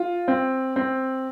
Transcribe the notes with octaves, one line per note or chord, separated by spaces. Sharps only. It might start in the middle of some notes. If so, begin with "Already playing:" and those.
Already playing: F4
C4
C4